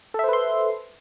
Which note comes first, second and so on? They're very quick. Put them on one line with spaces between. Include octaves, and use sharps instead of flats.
A4 E5 C5 B4 C6